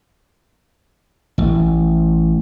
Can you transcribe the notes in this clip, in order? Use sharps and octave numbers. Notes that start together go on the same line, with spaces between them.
A1